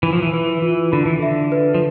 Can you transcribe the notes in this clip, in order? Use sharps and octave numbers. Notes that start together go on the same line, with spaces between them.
E3 B5
F3
E3
E3 B4
E3 F4
D3 B5
E3
D3 E5
B4
F3